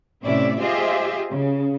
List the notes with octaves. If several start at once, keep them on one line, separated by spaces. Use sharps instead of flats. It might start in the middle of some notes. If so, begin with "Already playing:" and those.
A2 C3 C#4 E4 D5 E5
F4 G4 G#4 C5 D#5 E5
C#3